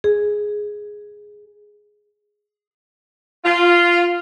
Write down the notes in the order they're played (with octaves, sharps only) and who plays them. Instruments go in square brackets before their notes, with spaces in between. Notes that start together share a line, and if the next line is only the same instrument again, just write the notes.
[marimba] G#4
[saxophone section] F4